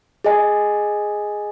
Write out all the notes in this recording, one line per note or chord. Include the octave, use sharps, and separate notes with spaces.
G#4 D#5 G#5